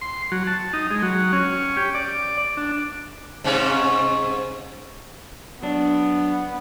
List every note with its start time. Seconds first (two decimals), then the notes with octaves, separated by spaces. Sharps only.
0.01 C6
0.32 F#3
0.47 A5
0.73 D#4
0.91 G#3
1.02 F#3
1.33 C#4
1.77 G4
1.95 D5
2.57 D4
3.44 G#2 C3 C#4
5.63 F#3 B3 D4